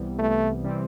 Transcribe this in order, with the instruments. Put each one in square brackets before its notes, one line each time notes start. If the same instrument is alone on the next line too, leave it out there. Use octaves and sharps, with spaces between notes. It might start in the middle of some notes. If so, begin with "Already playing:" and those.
Already playing: [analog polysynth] C2 C3 E3 G3 B3
[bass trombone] A3
[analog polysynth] C3 E3 G3 C4